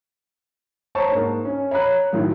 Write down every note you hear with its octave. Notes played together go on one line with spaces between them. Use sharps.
C5 C#5 A5 A#5 C#6
G#2 A#3
C#4
C#5 A#5 B5 F#6
A2 D#3 F3 F#3